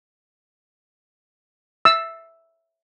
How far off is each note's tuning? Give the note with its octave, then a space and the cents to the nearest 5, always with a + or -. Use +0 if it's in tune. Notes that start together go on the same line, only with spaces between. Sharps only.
E5 +0 E6 +0